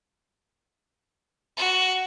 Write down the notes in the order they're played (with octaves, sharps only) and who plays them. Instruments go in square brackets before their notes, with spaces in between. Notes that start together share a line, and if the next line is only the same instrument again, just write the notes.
[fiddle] F#4